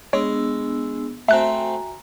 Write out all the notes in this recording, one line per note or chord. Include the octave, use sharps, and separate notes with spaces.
G#3 B3 D4 C#5 E6
A3 C4 F#4 E5 G#5 A#5 F#6